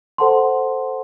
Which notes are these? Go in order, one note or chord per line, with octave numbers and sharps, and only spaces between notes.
A4 C5 F#5 A5 C6